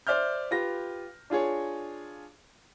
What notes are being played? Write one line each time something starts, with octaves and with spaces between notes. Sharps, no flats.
C5 D5 E5 F6 G6
F4 G4 B4 A#6
D4 F4 G#4 C#5